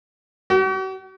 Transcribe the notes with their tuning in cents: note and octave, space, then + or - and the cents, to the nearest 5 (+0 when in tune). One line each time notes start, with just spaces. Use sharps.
F#4 +45